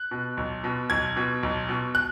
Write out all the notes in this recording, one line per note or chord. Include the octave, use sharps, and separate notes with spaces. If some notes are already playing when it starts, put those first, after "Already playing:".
Already playing: F#6
B2
B1
B2
B1 G#6
B2
B1
B2
F#6